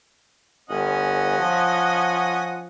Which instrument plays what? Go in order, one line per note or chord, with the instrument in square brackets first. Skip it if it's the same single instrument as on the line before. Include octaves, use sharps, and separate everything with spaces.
[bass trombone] G1 [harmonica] C#4 D#5 F#5
[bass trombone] F3